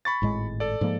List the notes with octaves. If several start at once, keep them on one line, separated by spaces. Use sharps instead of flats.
B5 C#6 A6
G#1 A2 G#3
A4 D5
G#2 F3 A#3